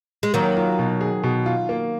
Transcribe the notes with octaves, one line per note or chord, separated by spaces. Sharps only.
G#3
D#3 F#3 A#3
F4
B2
G#4
B2
F4
A#3